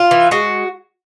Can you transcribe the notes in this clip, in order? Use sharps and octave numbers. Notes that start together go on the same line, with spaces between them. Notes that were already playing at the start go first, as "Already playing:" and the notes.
Already playing: F4
E3
G#3 F#4